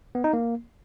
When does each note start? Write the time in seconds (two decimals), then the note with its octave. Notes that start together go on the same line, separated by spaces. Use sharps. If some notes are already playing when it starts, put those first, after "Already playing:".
0.15 B3
0.24 D#4
0.33 A#3